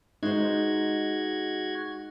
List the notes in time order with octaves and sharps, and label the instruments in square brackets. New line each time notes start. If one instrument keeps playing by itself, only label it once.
[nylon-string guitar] G#3 C5 [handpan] D#4 [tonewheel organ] F#4 G#6